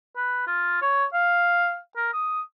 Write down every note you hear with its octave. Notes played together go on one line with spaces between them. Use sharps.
B4
F4
C#5
F5
A#4
D#6